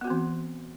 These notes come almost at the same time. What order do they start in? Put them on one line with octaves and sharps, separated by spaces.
B3 F#4 C4 E3